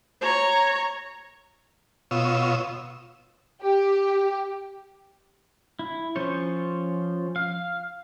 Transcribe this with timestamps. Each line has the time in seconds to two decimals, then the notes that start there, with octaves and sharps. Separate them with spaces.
0.21 C#5 A#5
2.11 B2 F4 C#5 D#6 E6
3.62 G4
5.79 E4
6.16 F3 C#4 C5 C#5
7.36 F5